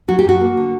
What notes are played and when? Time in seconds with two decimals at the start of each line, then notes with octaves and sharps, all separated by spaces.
0.08 F#3 F#4
0.19 G4
0.24 F#2 F#4
0.41 A#3
0.57 D3